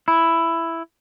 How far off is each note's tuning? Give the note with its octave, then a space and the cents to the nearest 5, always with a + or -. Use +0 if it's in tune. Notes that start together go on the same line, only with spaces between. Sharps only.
E4 +5